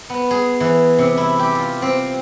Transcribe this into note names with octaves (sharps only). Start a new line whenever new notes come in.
B3
G#4
E3
C3
E4
G4
F4
C4